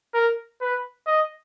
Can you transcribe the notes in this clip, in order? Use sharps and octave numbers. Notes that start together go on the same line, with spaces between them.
A#4
B4
D#5